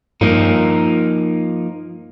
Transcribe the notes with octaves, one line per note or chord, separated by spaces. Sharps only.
G2 F3 A#3 D#4